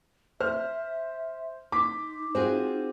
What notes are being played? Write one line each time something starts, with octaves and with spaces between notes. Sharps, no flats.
C5 E5 F6
D#4 C6 D6 B6
C4 F4 F#4 G#4 C5